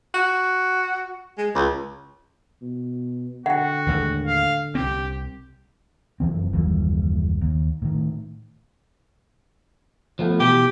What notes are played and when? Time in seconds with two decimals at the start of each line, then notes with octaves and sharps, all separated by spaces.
0.14 F#4
1.38 G#3
1.55 C#2
2.62 B2
3.46 D3 F#4 F#5 G5
3.87 D#2 A2 G#3
4.26 F5
4.75 C2 C4 G4
6.20 F1 F#2 E3 C4
6.53 F#1 D#2 E3 G3
7.41 D#2
7.82 A2 D#3
10.19 F3 A3 B3
10.40 B2 E3 G4